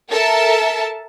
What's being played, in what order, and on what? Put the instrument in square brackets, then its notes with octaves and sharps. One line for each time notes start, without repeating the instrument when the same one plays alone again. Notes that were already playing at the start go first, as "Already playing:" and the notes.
[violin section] A4 A#4 E5 A5